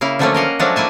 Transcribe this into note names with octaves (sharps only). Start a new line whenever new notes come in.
C#3 A#3 E4 F5
D3 F3 F#3 A3 A#3 C#4
A#4 D#5 F5 F#5
F3 F#3 G#3 A3 C#4 D4
A#3 E4 G#5 A5